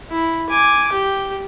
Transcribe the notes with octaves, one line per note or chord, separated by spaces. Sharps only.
E4
G#5 D6
G4